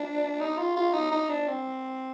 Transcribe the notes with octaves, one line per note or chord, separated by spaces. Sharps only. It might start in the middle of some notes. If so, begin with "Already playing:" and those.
Already playing: D4
D#4
F4
F4
D#4
D#4
D4
C4